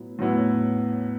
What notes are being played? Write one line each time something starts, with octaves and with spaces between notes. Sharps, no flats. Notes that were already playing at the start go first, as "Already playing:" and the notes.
Already playing: A2 F#3 B3 E4
A2 F#3 B3 E4